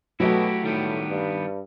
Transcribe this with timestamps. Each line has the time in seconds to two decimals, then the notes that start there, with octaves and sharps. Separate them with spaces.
0.20 B2 F#3 A3 E4 F#4 G4
0.63 A2 D#3 G3 B3
1.10 G2